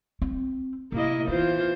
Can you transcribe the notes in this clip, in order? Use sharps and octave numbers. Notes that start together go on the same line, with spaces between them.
C4
C3 A#3 E4 D#5
E3 B3 F4 C5